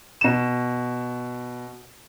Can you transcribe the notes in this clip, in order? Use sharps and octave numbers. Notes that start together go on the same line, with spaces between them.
B2 E7